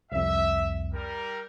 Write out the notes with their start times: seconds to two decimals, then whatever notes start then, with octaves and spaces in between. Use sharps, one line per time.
0.12 C2 F2 E5
0.94 G3 A#4